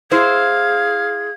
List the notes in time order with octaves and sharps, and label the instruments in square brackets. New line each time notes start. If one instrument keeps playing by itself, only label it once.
[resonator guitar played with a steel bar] E4 C5 [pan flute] G#4 [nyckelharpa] F5 [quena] G#6